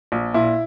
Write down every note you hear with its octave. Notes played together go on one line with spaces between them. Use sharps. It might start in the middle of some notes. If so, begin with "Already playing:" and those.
A#1
A#2 E4